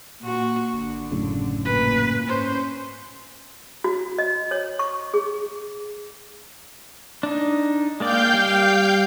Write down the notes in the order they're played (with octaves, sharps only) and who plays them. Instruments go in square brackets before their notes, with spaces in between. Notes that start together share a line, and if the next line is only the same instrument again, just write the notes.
[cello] A#2 F#4
[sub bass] G#1 [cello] D3
[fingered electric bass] F#2 A2 C#3
[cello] A#2 [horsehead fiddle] B4
[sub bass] G#2 [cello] C#4 [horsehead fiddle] C5
[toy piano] F#4
D#5
C#5
C#6
G#4
[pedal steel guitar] D4 D#4
[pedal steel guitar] G#3 A#3 D5 [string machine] F5 G5 G6
[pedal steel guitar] G3